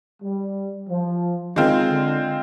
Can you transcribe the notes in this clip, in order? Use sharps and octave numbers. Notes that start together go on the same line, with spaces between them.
G3
F3
D#3 G#3 C4 F4
D3